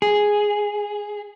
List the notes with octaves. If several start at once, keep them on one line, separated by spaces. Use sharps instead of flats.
G#4